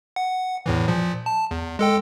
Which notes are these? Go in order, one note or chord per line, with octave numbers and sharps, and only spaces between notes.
F#5
E2 A2 E3
A#2 F3
A5
E2
G#3 A4 G5